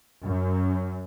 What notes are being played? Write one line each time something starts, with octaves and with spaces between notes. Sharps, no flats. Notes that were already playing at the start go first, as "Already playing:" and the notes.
F#2